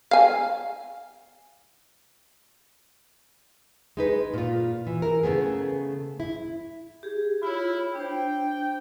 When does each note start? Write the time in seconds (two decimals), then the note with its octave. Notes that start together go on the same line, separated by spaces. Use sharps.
0.11 F5 G#5
3.97 G#3 D#4 B4
4.34 A#2 F4
4.87 E3
5.02 E4 A#4
5.23 C#3 A3 B3 G#4
6.20 E4
7.03 G4 G#4
7.43 E4 F4 C#5
7.95 D4 C5 G5